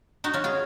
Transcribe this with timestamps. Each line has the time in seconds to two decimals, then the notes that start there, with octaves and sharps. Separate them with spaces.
0.24 D#4 F#4
0.34 C#4 F4
0.44 F4 G#4